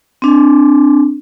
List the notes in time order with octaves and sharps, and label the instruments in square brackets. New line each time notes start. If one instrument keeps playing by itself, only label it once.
[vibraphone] C4 D4